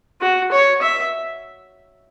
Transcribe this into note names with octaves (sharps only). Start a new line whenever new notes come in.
F#4
C#5
E5